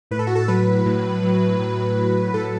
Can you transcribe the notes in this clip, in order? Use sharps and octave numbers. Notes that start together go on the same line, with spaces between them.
A2 B4
A4
F#4
A4
F#3 B4
A2
F#3
A2
F#3
A2 A4